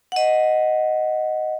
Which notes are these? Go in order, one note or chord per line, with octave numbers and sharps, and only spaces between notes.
D#5 F#5